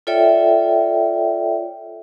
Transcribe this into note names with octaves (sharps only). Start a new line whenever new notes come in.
F4 A4 C#5 D5 E5 G5